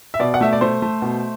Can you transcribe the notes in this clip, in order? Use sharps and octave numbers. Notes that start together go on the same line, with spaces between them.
E5
B2 D5
F#5
A3 E5
D5
A3 C5
A3
B2